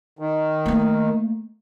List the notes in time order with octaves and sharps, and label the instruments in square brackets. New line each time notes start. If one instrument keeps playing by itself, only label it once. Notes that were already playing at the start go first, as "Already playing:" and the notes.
[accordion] D#3
[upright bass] A3 A#3